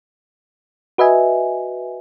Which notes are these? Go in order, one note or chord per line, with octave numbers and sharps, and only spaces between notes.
F#4 B4 D#5 E5 G#5